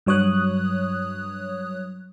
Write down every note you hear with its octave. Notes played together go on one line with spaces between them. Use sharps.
G2 F#3 C#5 D#6 F#6